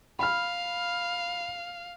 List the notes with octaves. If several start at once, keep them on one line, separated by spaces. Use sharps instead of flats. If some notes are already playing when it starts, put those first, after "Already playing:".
F5 B5 F6